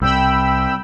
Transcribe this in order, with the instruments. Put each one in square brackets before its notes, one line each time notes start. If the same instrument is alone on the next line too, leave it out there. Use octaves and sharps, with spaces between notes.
[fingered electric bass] C2 C3 [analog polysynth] G5 B5 E6